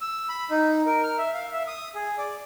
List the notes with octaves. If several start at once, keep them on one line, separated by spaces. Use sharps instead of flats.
E6
B5
D#4
A#4
F6
E5
F5
E5
D#6
G#4
D5